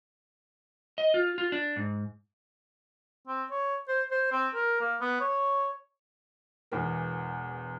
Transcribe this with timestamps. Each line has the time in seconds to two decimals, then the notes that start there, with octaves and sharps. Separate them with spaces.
0.98 D#5
1.14 F4
1.38 F4
1.52 D4
1.76 G#2
3.27 C4
3.51 C#5
3.88 C5
4.11 C5
4.32 C4
4.54 A#4
4.81 A#3
5.01 B3
5.20 C#5
6.72 E1 E2 E3 A#4